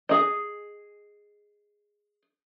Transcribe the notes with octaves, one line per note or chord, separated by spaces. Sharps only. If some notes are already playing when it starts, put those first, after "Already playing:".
G#4 D#5